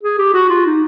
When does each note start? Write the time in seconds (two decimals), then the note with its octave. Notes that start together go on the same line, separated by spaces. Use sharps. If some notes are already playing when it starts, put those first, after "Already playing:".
0.03 G#4
0.18 G4
0.34 F#4
0.49 F4
0.66 D#4